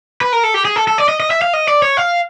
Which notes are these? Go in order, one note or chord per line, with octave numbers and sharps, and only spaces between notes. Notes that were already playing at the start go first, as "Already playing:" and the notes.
B4
A#4
A4
G4
G#4
A4
A4
D5
D#5
D#5
E5
F5
D#5
D5
C#5
F5